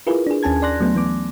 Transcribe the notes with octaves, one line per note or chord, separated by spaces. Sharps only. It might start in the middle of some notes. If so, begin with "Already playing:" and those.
E4 F4 G#4 A#4 B4
D4 G#4
D#2 C#4 G#5 A5 G#6
D5 C6 F#6 A#6
F#3 A3 B3
E3 B3 D6